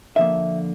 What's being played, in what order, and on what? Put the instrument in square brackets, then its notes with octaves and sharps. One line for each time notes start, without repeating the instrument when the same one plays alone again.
[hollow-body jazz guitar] D3 F3 A#3 E5